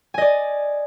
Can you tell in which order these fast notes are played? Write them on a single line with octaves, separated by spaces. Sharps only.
G#5 D#5 D5